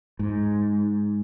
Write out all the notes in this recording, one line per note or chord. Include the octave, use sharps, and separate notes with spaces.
G#2